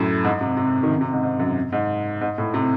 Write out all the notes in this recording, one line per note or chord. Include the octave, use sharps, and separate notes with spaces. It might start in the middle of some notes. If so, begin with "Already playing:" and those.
Already playing: F#2 A2
G#2
C3
C3
D#3
C#3
C3
G#2
G#2
F#2
G#2
G#2
A2
C3